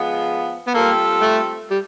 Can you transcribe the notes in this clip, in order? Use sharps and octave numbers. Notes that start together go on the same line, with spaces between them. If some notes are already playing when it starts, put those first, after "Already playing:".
Already playing: F3 G#3 B3
B3
G3 A#3 C4 F4 A4
A3
G3